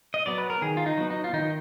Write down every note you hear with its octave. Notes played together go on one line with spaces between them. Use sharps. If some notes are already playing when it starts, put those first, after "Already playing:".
D#5
F#3 B3 D5
B4
A#4
D#3 G#4
F4
D#4
F#3 B3
D#4
F4
D#3 D#4